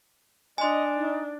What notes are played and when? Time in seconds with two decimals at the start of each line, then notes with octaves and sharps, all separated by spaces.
0.58 D4 D#5 G#5 C6
0.96 D#4